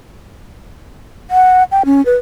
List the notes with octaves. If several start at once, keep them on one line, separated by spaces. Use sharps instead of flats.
F#5
G5
C#4
B4